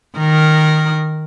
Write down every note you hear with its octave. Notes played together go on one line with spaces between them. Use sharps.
D#3 A#4